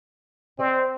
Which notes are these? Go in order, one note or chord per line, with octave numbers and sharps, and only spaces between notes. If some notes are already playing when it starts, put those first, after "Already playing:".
C4 C5 D5 D#5